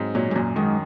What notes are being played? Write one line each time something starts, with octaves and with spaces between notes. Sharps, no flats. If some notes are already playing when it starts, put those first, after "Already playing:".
Already playing: G#2 F#3 C4
A#2 F#3
G#2
F#2 A#2
G#2 D#3